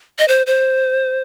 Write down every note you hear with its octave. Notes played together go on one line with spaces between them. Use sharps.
D#5
C5
C5